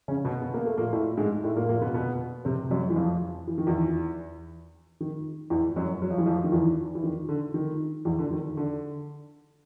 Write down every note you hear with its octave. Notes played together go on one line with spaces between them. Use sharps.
C#3 C#4
B2 B3
B3
A#3
A3
A#2 A#3
A2 A3
G#2 G#3
A2 A3
A#2 A#3
A#2 A#3
B2 B3
B2 B3
C3 C4
F#2 F#3
E3
F2 F3
E3
D#3
E2 E3
D#3
E2 E3
F#2 F#3
F#3
F3
E3
F2 F3
D#3
E2 E3
E3
D#3
D3
D#3
E2 E3
D3
D#3
D3